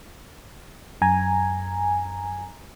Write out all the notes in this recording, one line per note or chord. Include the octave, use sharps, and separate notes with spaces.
F#2 G#5 A#5